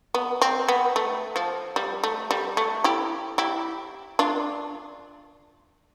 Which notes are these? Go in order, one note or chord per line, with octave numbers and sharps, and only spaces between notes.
B3
C4
B3
A3
F3
G3
A3
G3
A3
E4 G4
E4 G4
D4 F4